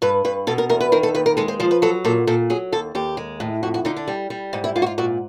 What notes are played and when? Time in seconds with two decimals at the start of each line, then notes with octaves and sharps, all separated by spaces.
0.02 G2 B4
0.25 G2 B4
0.47 B2 A4
0.58 A#4
0.69 E2 A#4
0.81 B4
0.92 D#3 A#4
1.03 A4
1.15 D#2 B4
1.26 A#4
1.37 G#3 A4
1.48 C5
1.60 F3 C5
1.71 B4
1.82 F#3 A4
2.05 A#2 A4
2.27 A#2 A4
2.50 F#3 G#4
2.72 D#2 A4
2.95 D#2 G4
3.17 G#3
3.40 A2
3.63 F2 F#4
3.74 F#4
3.85 D3 D#4
3.97 D4
4.08 G3
4.30 G3
4.53 G#2 D#4
4.64 E4
4.76 G#2 F4
4.82 F#4
4.86 F4
4.98 A#2 F#4